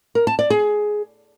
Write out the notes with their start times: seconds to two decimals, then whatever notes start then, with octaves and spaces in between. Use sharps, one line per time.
0.15 A#4
0.27 A5
0.39 D5
0.50 G#4